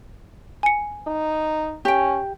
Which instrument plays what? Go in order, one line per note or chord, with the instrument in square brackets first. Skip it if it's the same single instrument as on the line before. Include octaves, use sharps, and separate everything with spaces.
[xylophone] G#5 C#7
[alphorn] D#4
[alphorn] C#4 [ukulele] G4 G5